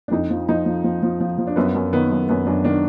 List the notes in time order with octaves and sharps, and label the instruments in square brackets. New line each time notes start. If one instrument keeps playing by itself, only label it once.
[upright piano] D4
F2 D#4
F3
F3 D#4
F3
F3
F3
F3
F3
D4
F#2 B3
F#2
D#3 B3
F#2
F#2 B3
F#2 D4
D#3 D4